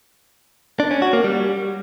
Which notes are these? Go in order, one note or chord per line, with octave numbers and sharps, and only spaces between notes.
D4
C#4
F#4
A#3
G3